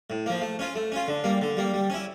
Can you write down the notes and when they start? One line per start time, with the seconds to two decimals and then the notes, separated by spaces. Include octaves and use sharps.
0.10 A2
0.26 F3 A#3
0.42 A3
0.59 C#4 F4
0.75 A3
0.92 C#4 F4
1.08 D3
1.24 G3 A#3
1.42 D3
1.57 G3 A#3
1.74 G3
1.90 C#4 E4